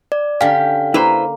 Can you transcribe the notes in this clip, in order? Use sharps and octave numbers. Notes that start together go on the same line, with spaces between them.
D5
D3 C#4 G4 F5
A#3 E4 B4 C5